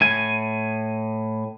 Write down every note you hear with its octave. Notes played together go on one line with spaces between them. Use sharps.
A2 G#5